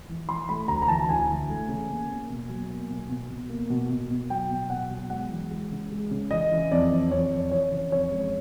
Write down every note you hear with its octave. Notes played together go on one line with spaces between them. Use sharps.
E3
E3 C6
A3 B5
D2 A#5
A#5
E3 A5
D2 G#5
E3
A3
C#3
A#3
A#3
B2
F#3
A#3
B2
B2
B2
A#3
B2
B2
B2
F#3 G5
B2
B2 F#5
F#3
G#3 F#5
E3
G#3
C#3
G#3
C#3
E3 D#5
E3
F2 D5
E3
F2 C#5
E3
E3 C#5
C#3
F2 C#5
G#3